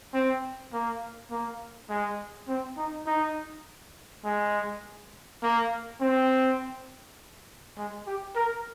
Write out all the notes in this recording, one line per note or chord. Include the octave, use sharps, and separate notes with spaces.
C4
A#3
A#3
G#3
C4
D#4
D#4
G#3
A#3
C4
G#3
G4
A#4